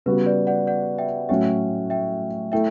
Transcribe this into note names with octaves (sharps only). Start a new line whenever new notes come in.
C#3 G3 B3 F#4 B4
B4 D5
D5 F#5
D5 F#5
E5 G5
A2 F#3 C#4 F#4 E5 G5
E5 G5
A3 E4 E5 G5